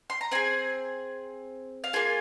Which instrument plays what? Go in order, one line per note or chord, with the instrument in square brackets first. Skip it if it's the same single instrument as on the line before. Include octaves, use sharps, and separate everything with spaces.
[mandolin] C6
A#5
C4 G#4 G#5
F5
A#3 F4 G#4 G#5